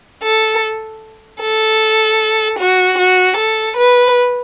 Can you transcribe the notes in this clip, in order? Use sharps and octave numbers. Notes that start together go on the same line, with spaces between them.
A4
A4
F#4
F#4
A4
B4